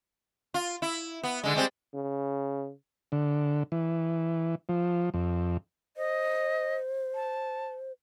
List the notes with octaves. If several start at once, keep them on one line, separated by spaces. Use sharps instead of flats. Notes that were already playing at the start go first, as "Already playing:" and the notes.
F4
E4
B3
D3 G#3
G3 G#3 C4
C#3
D3
E3
F3
F2
C5 D#5
A5